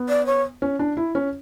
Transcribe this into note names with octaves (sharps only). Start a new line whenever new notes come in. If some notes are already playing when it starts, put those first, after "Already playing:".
Already playing: B3
D5
C#5
C#4
D4
E4
C#4